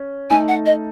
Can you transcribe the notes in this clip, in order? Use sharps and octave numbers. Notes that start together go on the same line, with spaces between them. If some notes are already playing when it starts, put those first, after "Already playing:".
Already playing: C#4
A3 D#4 A4 G#5
F#5
D#5